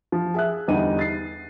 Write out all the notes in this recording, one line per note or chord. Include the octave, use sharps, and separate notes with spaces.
F3
G#4 E5 F#6
E2 D3 G3 D#4 D#7
A6 C7